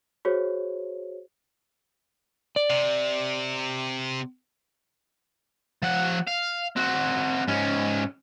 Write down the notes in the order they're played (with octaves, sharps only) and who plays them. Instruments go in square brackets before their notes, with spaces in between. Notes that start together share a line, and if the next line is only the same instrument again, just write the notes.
[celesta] F#4 G#4 C5 C#5
[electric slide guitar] D5
[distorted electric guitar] C3
F3 F#5
F5
C4 F#4
G#2 C#4